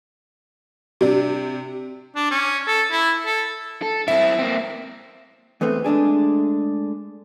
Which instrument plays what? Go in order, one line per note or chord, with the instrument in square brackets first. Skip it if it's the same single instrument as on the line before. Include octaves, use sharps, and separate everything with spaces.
[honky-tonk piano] C3 D4
[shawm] D4
C#4
A4
E4
A4
[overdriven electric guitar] A4
[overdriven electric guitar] C4 E4 [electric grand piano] E5
[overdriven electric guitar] A#3 C4
[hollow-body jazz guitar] E2 A3 B3 C4
G#3 A3 D4 G#4